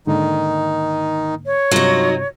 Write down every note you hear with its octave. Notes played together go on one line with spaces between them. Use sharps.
G#2 D3 D#3 A#3 D#4
C#5
G2 C3 F#3 D#4 F4